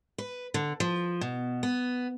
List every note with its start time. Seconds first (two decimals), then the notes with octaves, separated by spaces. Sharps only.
0.18 B4
0.54 D3
0.80 F3
1.21 B2
1.63 B3